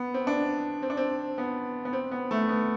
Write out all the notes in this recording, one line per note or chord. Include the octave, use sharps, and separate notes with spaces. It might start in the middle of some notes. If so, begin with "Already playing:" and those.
Already playing: B3
C4
D4
C4
D4
C4
B3
B3
C4
B3
A3
B3